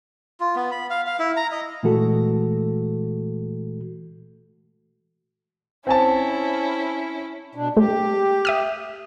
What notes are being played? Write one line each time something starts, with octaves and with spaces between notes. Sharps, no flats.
F4
B3
B5
F5
F5
E4
A#5
D#5
A#2 E3 G#3 A3 F#4 A4
C4 C#4 E4 G#5 A5
B2 D4
A3 G4
E5 D#6 F6